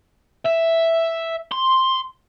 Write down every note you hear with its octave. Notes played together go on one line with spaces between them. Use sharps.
E5
C6